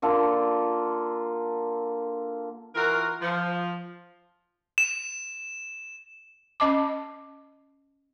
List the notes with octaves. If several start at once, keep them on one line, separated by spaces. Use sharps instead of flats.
D3 A#3 F4 A4
E3 F4 F#4 A#4
F3
E7
C#4 D#5 A5 D6